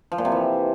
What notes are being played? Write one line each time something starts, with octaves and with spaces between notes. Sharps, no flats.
F3
A#2
C3
E3